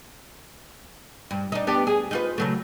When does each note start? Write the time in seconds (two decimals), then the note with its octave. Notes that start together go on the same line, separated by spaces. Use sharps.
1.31 G2
1.52 D4 D#4
1.67 B3 D4 G4
1.87 G#4
2.11 D#4 F4 B4
2.38 C#3 F#3 A3